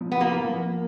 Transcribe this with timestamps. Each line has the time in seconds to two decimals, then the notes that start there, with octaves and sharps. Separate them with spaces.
0.01 F3
0.12 B3
0.21 A#3 F4
0.40 F3
0.60 A#3